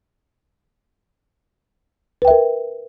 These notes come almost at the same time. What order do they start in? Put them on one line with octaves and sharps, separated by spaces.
B4 G5 E5 A#4